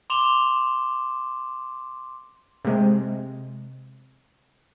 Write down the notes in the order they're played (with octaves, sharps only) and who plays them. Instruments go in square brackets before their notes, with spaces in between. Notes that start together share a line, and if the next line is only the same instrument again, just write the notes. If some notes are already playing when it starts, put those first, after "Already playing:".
[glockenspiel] C6 D6 E7 F7 G7
[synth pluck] C3 G#3